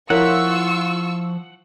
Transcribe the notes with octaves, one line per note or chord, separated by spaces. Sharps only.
F3 E4 F4 A#4 C#5 F#5 C#6 E6